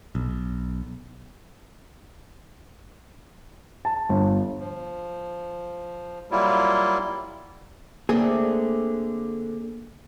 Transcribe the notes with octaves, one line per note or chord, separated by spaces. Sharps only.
B1
A5
G1
F3
F#3 G3 A#3 E4 F4
D3 A3 A#3 C4 G#4